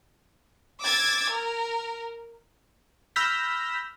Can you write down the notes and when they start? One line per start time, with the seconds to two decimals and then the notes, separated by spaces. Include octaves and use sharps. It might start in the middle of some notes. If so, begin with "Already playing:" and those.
0.83 D6 E6 G#6 A6
1.32 A#4
3.16 B5 E6 F6 G6 A#6 B6